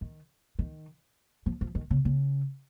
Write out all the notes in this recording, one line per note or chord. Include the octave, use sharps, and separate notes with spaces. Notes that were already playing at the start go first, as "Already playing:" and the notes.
D#3
D#3
F3
F3
D#3
C#3
C#3